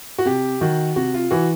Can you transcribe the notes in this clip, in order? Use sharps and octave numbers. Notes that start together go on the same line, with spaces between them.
F#4
C3 G4
D#3 F#4
C3 F#4
F4
E3 F#4